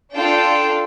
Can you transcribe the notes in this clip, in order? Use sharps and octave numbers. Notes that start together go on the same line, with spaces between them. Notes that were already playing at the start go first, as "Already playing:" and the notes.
D4 F4 A4 G5